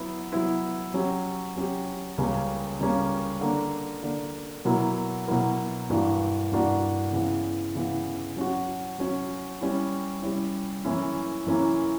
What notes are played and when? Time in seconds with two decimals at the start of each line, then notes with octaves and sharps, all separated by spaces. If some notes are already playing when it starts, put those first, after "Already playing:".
Already playing: F#3 B3 E4 B4
0.32 F#3 B3 E4 B4
0.94 F#3 C#4 G4
1.56 F#3 C#4 G4
2.18 C#2 C#3 G3 A#3 C#4
2.79 C#2 C#3 G3 A#3 C#4
3.41 D3 A#3 D4
4.03 D3 A#3 D4
4.65 B2 F#3 A#3 E4 A#4
5.28 B2 F#3 A#3 E4 A#4
5.90 G2 E3 A#3 D4 F#4
6.52 G2 E3 A#3 D4 F#4
7.12 C#3 E3 B3
7.75 C#3 E3 B3
8.36 F#3 C#4 F#4
8.99 F#3 C#4 F#4
9.61 G3 C#4 E4
10.22 G3 C#4 E4
10.85 F#2 E3 A#3 C#4 E4
11.47 F#2 E3 A#3 C#4 E4